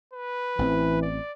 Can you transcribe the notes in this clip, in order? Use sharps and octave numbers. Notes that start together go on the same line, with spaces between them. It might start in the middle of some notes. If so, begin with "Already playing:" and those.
B4
A1 E3 C4
D5